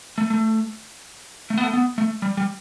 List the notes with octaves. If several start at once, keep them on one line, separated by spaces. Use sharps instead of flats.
A3
A3
A3
B3
A3
B3
A3
G3
G3